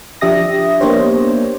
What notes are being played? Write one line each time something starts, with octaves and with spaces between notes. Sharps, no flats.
F3 D4 G4 E5 D#6 A#6
A#3 B3 D4 G4 C5 C#5